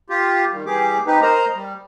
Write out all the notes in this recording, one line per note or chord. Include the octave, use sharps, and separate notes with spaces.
F4 G4
D#3 G3
E3 G3 G4 G#4 D6
C4 D#4 G4 B4
A#4 C5 D#5 A#5
G3